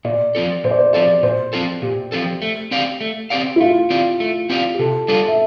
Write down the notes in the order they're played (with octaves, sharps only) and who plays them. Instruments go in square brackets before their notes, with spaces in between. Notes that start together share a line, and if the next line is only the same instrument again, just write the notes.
[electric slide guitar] A#2 [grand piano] D5
[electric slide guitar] F3 C4 F4 A4
[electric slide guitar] A#2 [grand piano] C5
[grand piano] D5
C5
[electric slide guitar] F3 C4 F4 A4 [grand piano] D5
[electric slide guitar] A#2 [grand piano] C5
[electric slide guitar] F3 C4 F4 A4
[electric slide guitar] A#2 [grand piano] G4
[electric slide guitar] F3 C4 F4 A4
A3
C4 G4 D5 F5
A3
C4 G4 D5 F5
[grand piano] E4
[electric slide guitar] A3 [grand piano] F4
[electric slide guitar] C4 G4 D5 F5
A3
C4 G4 D5 F5
[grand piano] G4
[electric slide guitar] C3 [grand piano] A4
[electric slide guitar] G3 D4 F4 [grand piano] A4
[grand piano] E5